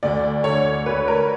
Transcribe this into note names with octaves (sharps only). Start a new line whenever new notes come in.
D2 D5
D3 C#5
D2 B4
A#4